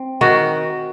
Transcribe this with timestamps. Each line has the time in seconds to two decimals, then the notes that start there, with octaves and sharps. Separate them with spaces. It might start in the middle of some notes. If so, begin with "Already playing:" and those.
Already playing: C4
0.21 D#3 F#4